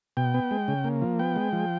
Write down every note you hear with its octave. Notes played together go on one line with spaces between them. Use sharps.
B2 G5
B3
G#3
C#3
A#3
F3
B3 G5
G#3
F3